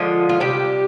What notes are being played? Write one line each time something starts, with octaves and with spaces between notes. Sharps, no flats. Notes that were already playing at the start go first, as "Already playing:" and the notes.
Already playing: D3 F3 G#3 F4
F4
C3 G3 G4